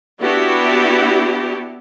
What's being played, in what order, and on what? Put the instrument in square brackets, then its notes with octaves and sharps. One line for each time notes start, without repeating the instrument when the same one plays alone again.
[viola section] B3 D4 E4 F#4 G4